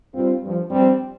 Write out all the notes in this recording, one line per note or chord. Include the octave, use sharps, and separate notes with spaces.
G2 G3 C4 F4
G2 F3
G2 F3 G3 C4